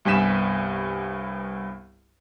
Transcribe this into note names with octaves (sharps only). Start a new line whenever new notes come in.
C2 G2 B3 G#5 B6 E7